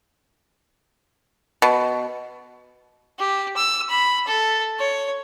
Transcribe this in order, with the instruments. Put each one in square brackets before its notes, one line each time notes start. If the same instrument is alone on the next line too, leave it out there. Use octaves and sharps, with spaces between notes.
[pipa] B2
[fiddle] G4
E6
B5
A4
C#5